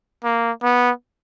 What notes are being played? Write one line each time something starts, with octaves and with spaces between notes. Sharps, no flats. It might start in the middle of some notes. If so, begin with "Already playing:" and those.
A#3
B3